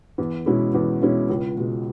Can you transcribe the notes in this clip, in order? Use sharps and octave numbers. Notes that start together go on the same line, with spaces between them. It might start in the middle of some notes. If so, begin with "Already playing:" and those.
E2
B2 G#3 C#4 E4
E2
B2 G#3 C#4 E4
C#2
B2 G#3